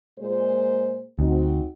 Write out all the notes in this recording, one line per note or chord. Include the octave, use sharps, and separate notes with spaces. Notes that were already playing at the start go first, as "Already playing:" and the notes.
A#2 G#3 C5
D2 C4 D#4 F#4